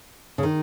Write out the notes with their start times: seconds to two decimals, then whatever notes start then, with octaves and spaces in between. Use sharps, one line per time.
0.38 C#3
0.43 D#3